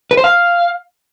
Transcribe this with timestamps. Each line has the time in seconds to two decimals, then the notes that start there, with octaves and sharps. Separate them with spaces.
0.11 B4
0.17 C5
0.24 F5